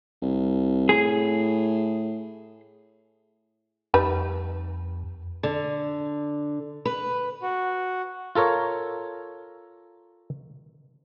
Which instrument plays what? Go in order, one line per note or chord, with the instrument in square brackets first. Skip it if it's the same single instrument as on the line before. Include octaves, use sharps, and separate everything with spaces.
[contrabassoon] C2
[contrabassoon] A2 [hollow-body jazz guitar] G#4
[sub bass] F2 [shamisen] G3 D#4 B4
[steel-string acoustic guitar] D3
B4
[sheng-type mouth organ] F#4
[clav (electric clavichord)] F4 A4 A#4 C#5